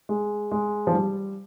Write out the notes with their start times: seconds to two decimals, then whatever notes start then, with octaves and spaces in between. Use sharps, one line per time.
0.09 G#3
0.52 G#3
0.87 F3
0.94 G3